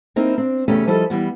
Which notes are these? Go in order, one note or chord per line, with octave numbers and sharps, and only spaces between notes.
A#3 C4 D#4 E4 A#4
C4 D4
E2 C#3 A3 C#4 G4
F3 G3 E4 A4 A#4 D#5
E3 G3 B3